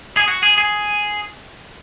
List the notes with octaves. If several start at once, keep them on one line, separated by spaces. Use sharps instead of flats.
G#4
F#4
G#4
G#4